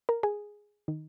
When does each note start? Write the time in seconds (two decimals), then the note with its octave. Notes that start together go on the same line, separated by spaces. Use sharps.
0.09 A#4
0.23 G#4
0.88 D#3